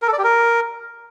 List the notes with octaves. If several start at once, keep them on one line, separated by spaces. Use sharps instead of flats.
A#4
A4
D5
G4
A#4